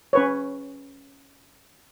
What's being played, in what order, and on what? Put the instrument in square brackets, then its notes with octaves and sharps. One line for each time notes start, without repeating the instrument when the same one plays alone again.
[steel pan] C#4 B4 C#5